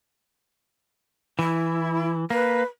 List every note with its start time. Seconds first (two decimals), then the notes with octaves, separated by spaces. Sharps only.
1.39 E3 E4
2.30 A#3 B4